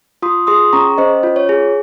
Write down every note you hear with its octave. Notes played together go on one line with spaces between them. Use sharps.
F4 C6 D#6
G#4 C6 D#6
C#4 A#5 C#6
C#4 C5 D#5
F4
C#5
G#4